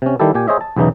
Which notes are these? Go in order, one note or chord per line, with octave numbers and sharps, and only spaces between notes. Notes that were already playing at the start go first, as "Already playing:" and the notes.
C3 C#4
D#3 G3 E4 G4 A4
A#2 G4 G#5
G#4 C5 C#5 D#5 E5
A5
B1 E2 C#3 E3 D#4